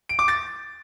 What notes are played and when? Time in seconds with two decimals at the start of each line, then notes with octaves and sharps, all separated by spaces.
0.09 D7
0.19 D6
0.28 A6